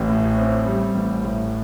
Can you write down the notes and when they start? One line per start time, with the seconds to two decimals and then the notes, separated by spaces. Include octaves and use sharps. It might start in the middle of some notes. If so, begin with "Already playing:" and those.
Already playing: A1
0.09 A2
0.38 C4
0.66 G3
0.95 A1
1.24 A2